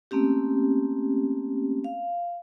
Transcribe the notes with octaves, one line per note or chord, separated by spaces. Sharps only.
A3 A#3 C4 C#4 G4
F5